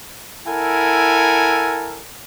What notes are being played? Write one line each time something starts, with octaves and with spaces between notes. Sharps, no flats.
E4 A4 A#4 F#5 G#5